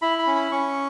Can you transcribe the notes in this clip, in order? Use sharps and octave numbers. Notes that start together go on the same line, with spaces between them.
E4 B5
B5
C#4
B5
C#4 C#6